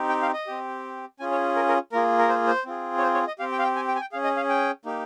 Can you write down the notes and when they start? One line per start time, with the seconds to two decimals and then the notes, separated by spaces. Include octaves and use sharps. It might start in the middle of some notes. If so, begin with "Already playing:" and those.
Already playing: C4 D#4 G4
0.09 G5
0.22 F5
0.33 D#5
0.47 C4 G4
1.19 C#4 F4 G#4 G#5
1.32 C#5
1.56 A#4
1.68 A#4
1.92 A#3 F4 G#4 A#4
2.19 A#4
2.29 C5
2.47 C5
2.65 C4 F4 G#4
2.98 C#5
3.02 C5
3.14 C#5
3.27 D#5
3.39 C4 G4 F5
3.52 G5
3.59 F5
3.63 G5
3.76 G#5
3.88 G5
3.96 G#5
4.01 G5
4.12 G#4 F5
4.15 C#4
4.24 D#5
4.37 F5
4.49 G5
4.85 A#3 D#4 G4